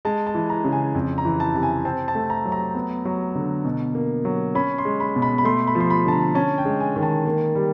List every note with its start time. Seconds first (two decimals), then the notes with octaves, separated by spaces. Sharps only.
0.05 G#3 A5
0.27 A5
0.35 E3
0.50 A#5
0.65 C#3
0.72 G#5
0.95 F2
1.18 A#5
1.25 E3
1.40 A5
1.54 C3
1.63 G#5
1.85 C4 A5
2.08 A5
2.15 A3
2.30 A#5
2.45 F#3
2.52 A#5
2.75 B3
3.05 F#3
3.35 D3
3.65 B2
3.95 A#3
4.25 F#3
4.55 C#4 B5
4.78 C6
4.85 G#3
5.00 B5
5.16 B2
5.22 B5
5.38 B5
5.45 A3 C6
5.67 B5
5.75 F3
5.80 C6
5.90 B5
6.06 D3 A5
6.12 A#5
6.35 C#4 A5
6.58 G5
6.65 G#3
6.80 G#5
6.96 D#3
7.03 A5
7.25 A#3
7.55 G3